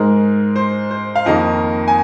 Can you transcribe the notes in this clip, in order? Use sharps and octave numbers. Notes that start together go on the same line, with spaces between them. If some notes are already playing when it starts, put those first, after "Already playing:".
Already playing: G#2 G#3 A#4
C5
C5
F5
F2 D#3 A#3 D#5
G#5